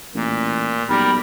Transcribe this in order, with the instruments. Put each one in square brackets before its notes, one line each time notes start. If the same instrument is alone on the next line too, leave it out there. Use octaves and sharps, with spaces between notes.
[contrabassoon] A1 [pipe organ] A#2
[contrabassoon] B1 [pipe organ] G3 A#4 [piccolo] B5